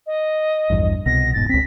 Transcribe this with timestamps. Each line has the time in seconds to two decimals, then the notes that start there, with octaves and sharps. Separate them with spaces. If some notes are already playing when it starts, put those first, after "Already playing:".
0.06 D#5
0.70 A#1 E2 G2
1.06 C2 B2 A#6
1.34 E1 G#2 B2 A6
1.49 C#2 C4 B6